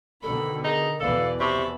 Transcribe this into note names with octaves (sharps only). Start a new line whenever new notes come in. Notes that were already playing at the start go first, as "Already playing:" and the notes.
B2 D3 D#3 A4 B5
D#4 G#4 A#4
E2 B2 E3 A4 B4 D5 F5
C3 A5 B5 C#6